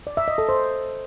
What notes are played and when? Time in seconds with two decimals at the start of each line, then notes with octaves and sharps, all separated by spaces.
0.07 D5
0.17 E5
0.28 D#5
0.38 A4
0.49 C5